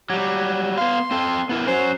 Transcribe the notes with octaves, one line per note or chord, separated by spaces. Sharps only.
F#3 G3 G4
B3 F5 C6
C4 A4
B3 E4 A#4
C#4 F#4 C5